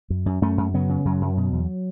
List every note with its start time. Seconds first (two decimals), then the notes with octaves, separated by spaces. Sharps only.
0.10 F#2
0.26 F#2
0.42 F#2 A3 C#4
0.57 F#2
0.74 C#3 F#3 B3
0.89 C#3
1.05 F#2 F#3
1.21 F#2
1.37 B2
1.53 E2